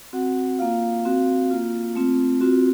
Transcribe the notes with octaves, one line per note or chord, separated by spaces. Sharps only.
C4 F#4 F#5
A#3 F4 F5
C4 F#4
A#3 F4
A3 C4 F4
C4 F4 F#4